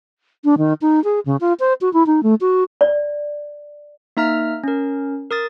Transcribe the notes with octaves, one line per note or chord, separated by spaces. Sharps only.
D4
D#3
D#4
G#4
C#3
F4
C5
F#4
E4
D#4
A3
F#4
D5
A#3 D#4 E5 A#5 F6
C#4 A#4
A#4 D#6 A6